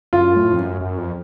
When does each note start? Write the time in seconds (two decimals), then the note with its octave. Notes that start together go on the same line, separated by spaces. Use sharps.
0.13 F#2 F4
0.36 A2
0.53 F2
0.58 F#2
0.81 F#2
0.98 F2